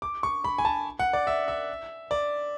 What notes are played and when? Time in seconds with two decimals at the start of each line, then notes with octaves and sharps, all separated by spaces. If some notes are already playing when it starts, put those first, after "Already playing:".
0.02 D6
0.23 C#6
0.44 B5
0.58 G#5
0.65 A5
0.99 F#5
1.13 D5
1.27 E5
1.48 E5
2.11 D5